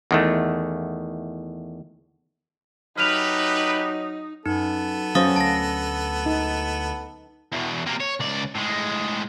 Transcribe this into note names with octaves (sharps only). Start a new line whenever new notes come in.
E2 D#3 A3
F#3 A3 D#4 G4 B4 F6 F7
F#2 B3 D#4 A4
F#3 C#4 C5 F5 D#6 A6
D2 A5 A#6
D#4
E2 B2
C3 A#3
C#5
C#2 D5
A2 G#3